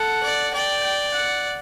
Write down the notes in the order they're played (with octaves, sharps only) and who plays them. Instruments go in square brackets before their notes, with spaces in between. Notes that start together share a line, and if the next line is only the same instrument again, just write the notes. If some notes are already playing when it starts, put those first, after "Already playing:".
Already playing: [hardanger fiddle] A4 [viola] F#5
[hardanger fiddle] D5
[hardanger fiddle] D5 [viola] G5
[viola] G5
F#5